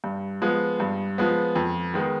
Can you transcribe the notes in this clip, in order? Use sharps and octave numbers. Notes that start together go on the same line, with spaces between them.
G2
F3 G#3 B3
G2
F3 G#3 B3
F2
D#3 G#3 B3